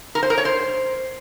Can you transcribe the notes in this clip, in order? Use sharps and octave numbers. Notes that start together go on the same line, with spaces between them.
A#4
C5
A#4
C#5
C5